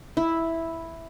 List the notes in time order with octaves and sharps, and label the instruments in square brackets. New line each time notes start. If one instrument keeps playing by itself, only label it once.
[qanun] E4